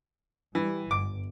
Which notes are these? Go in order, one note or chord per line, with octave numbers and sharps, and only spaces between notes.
E3 G3
G1 D6